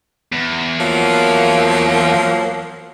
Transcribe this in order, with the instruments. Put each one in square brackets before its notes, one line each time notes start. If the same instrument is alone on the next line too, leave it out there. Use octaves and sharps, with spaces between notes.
[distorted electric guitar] E2
[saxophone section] F3 F#3 A#3